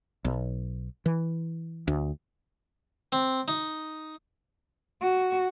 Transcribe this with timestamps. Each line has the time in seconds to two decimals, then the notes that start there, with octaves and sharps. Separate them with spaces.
0.25 B1
1.06 E3
1.88 D2
3.12 C4
3.48 D#4
5.01 F#4